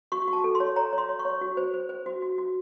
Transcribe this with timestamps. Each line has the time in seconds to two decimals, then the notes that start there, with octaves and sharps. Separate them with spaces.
0.12 F#4 C#6
0.28 F#4
0.33 A5
0.44 A4
0.55 C6
0.60 C#5
0.76 C#5 A#5
0.93 C#5
0.98 C6
1.09 C#5
1.19 C#6
1.25 C#5
1.41 F#4
1.57 C5
1.74 C5
1.89 C5
2.06 F#4
2.22 F#4
2.38 F#4